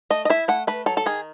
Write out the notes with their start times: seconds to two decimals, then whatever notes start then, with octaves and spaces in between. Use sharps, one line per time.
0.10 A3 D#5
0.25 D#5
0.30 E4 E5
0.48 A3 F#5
0.67 A3 B4
0.86 F#3 A4
0.97 A4
1.06 D#3 G#4